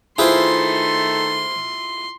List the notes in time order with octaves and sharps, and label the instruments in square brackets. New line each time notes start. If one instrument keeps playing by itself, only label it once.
[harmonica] D#3 A3 [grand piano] E4 F4 [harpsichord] G#4 B4 C5 [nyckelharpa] C6